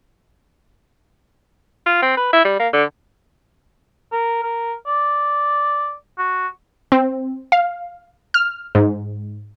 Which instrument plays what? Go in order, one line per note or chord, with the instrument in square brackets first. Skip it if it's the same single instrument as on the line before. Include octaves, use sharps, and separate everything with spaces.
[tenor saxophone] F4
C4
B4
E4
G3
A#3
D3
[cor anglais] A#4
A#4
D5
F#4
[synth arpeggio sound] C4
F5
F6
G#2